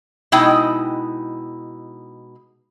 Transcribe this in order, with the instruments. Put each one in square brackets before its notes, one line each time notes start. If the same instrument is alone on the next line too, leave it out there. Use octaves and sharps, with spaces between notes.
[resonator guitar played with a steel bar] B2 G#3 D#4 E4 G5